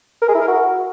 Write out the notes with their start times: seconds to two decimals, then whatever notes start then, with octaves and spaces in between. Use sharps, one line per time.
0.22 A#4
0.28 G#4
0.35 E4
0.41 A#4
0.48 F#4